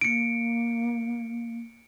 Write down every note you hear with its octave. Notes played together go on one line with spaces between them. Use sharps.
A#3 C#7 D7